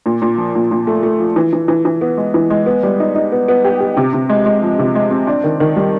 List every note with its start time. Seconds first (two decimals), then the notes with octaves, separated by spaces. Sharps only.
0.06 A#2
0.22 A#2
0.38 F3
0.55 A#2
0.71 A#2
0.87 A3
1.03 A3
1.20 F3
1.36 E3
1.53 E3
1.68 E3
1.85 E3
2.01 B3
2.17 G#3
2.34 E3
2.50 G#3
2.66 B3
2.83 G3
3.00 D#4
3.15 D#4
3.32 B3
3.48 B3
3.64 G4
3.80 G4
3.97 C3
4.13 C3
4.29 G#3
4.46 G#3
4.62 F3
4.79 C3
4.95 G#3
5.11 C4
5.27 D4
5.44 D#3
5.60 D#3
5.76 G3